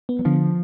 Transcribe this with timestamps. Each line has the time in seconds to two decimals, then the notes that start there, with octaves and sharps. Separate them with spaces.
0.09 B3
0.19 F#3
0.25 D3 F3